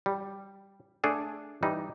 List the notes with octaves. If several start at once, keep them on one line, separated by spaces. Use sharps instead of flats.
G3
A3 D4 G#4 A4
E3 G3 D#4